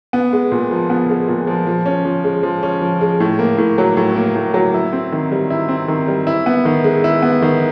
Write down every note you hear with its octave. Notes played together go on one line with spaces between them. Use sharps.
B3
G#3
A#2
F3
B3
G#3
A#2
F3
F3
C#4
F3
G#3
F3
C#4
F3
G#3
A2
A#3
A2
F#3
A2
A#3
A2
F#3
E4
C4
D#3
G3
E4
C4
D#3
G3
E4
B3
D#3
G#3
E4
B3
D#3